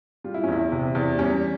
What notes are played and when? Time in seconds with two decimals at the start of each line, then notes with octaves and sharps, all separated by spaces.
0.24 G3 F4
0.34 E4
0.44 C#4
0.48 E2 E4
0.72 C3
0.95 E2
1.18 G3 C#4